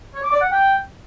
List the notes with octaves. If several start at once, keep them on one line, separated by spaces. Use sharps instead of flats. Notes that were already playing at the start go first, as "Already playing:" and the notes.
C#5
D6
D5
F#5
G5